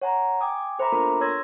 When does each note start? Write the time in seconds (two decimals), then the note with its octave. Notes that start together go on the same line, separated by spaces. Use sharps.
0.02 C#5 F#5 G#5 A#5
0.41 G5 G#5 D6 D#6
0.79 A4 C5 E5 A#5 B5 D6
0.92 A#3 B3 D4 F4 A4 A#4
1.21 C#5 C6 E6 G#6 A#6